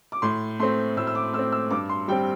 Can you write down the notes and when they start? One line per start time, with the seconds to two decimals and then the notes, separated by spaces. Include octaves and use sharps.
0.12 D6
0.22 A2 C6
0.59 A3 C4 C6
0.97 A2 E6
1.07 E6
1.15 D6
1.33 A3 E6
1.39 C4
1.52 E6
1.71 G2 D6
1.89 C6
2.08 G3 G5
2.12 C4